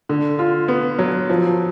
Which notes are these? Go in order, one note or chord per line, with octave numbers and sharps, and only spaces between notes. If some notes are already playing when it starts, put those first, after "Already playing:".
D3
F4
B3
F#3
F3